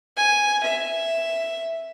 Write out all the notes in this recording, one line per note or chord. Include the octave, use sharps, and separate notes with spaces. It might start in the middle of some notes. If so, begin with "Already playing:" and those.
G#5
E5